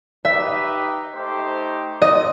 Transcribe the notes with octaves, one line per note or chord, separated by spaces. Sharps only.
D#4 G4 B4 D#5 E5
A3 D#4 G4 C5
C4 D#5